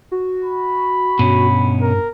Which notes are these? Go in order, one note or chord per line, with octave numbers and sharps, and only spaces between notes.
F#4
B5
G2 B2 C#4
A#4